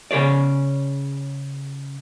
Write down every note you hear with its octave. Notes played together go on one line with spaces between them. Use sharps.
C#3 G#4 C#5 D5